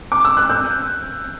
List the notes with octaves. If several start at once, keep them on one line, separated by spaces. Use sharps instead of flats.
D6
E6
F#6
E6 G6